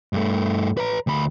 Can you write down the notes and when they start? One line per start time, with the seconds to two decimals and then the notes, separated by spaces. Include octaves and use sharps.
0.13 G2 A3
0.77 B4 A#5
1.07 D2 B5